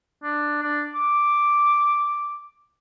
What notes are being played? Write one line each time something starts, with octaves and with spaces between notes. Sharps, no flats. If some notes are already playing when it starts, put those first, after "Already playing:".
D4
D4
D6